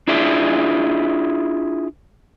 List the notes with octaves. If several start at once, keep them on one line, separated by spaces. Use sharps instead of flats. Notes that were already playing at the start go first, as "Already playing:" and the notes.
D4 E4 F4 G#4 D5 E5